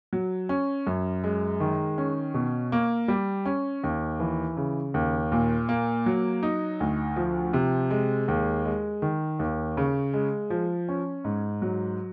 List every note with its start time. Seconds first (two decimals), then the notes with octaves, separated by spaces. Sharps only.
0.13 F#3
0.49 C#4
0.87 F#2
1.24 G#3
1.60 D#3
1.98 C#4
2.34 B2
2.72 A#3
3.08 G3
3.45 C#4
3.84 D#2
4.20 E3
4.57 C#3
4.94 D#2
5.32 A#2
5.69 A#3
6.06 F#3
6.43 D#4
6.80 D2
7.16 F3
7.53 C3
7.91 G#3
8.28 D#2
8.65 G#3
9.02 D#3
9.39 D#2
9.77 C#3
10.13 G#3
10.50 F3
10.89 C#4
11.24 G#2
11.62 F#3